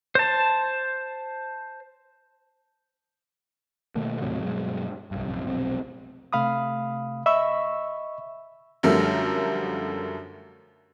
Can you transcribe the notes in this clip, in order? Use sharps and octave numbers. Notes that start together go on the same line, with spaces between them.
C5 A5
B2 D#3 A3 A#3
D#2 A2 C3 F#3
G2 B2 F#3 G#3
B1 G2
A#1 F#2 C3
F1 B1 C4
C3 A3 F5 B5 D#6
D#5 E5 B5 C#6 E6
F#2 D3 F3 G3 A3 A#4